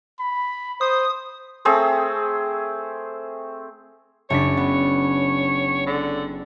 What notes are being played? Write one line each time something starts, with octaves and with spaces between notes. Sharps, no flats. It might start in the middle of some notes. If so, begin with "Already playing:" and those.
B5
C5 D#6
A3 C4 G#4 C5
F#1 D4 C#5 B6
B3
D3